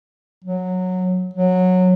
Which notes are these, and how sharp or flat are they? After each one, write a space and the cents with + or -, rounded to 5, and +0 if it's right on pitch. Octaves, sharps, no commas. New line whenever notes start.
F#3 -10
F#3 -15